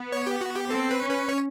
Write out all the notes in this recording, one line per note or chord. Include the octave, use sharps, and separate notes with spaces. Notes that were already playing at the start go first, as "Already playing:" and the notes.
Already playing: B3
C#5
G4
F#4
G4
C4 A4
B4
C#4
B4
C#5